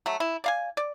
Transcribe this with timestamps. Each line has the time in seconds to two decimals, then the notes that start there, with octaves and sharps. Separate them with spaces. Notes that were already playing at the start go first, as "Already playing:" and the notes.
0.06 F#3 A3
0.20 E4
0.44 D5 F5 G#5
0.77 D5